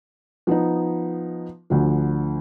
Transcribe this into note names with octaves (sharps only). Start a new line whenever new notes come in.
F3 B3 D#4
D2 D3 F3